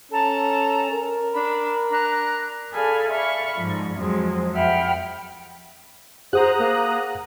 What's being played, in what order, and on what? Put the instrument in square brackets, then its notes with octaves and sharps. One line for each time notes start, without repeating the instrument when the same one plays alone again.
[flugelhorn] C#4 [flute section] A4 A5 A#5
[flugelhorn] A#4
[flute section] D4 B5
D4 A#5 F#6
[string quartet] G#4 A4 D5 F5 G#5 B5
D5 E5 F5 B5 C#6
G#2 F3
F2 F3 F#3 G#3 C4
F2 E5 F#5 G5 B5 F6
[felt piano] G#4 F#5 [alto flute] C5 [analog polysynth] A#5 D#6 F#6
[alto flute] A#3